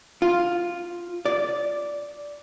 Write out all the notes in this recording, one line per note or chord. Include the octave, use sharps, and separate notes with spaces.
F4
D5